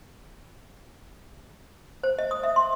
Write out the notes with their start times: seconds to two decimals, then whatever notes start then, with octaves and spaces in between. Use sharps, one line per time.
2.04 C5
2.19 D#5
2.31 D#6
2.44 E5
2.56 C6